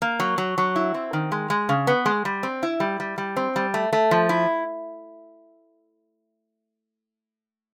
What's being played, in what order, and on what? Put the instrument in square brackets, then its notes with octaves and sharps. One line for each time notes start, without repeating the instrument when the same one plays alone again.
[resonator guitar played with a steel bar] A#3
F#3
F#3
F#3
E4
C4
D#3
G#3
G#3
C#3
B3
G#3
G3
C4
E4
G3
G3
G3
C4
G3
A3
A3
F3
E4